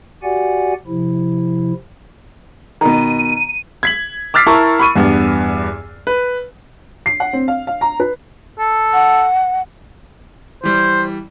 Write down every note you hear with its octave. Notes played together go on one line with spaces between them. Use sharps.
F#4 G4 D5 F#5 G#5
C3 F3 E4
B2 D#3 A#5 D#7
G#6 B6 F#7
D6 E6 F6 A6 B6 C7
E4 A#4 A5 C#6
B5 C#6 D#7
E2 G2 B3
B4
C7
F#5
C4
F5
F5
A#5
B4
A4
F#5
E3 G3 C5